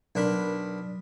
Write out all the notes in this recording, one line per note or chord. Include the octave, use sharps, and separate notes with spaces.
B1 D4 A#4 B5